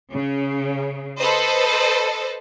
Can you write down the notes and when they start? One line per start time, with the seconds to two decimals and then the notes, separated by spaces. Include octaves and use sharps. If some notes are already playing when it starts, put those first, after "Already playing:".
0.13 C#3
1.19 A4 B4 C5 D#5